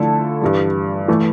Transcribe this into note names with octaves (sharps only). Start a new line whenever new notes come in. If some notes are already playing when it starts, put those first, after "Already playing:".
Already playing: D3 F3 A3 E4 A4
G2 E3 G3
E3 A3